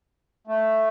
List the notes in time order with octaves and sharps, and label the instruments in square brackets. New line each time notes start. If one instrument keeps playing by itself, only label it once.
[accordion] A3